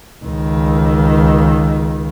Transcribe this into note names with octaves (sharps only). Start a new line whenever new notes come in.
C#2 D#3